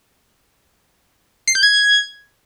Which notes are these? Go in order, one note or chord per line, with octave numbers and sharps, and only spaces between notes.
C7
G6
G#6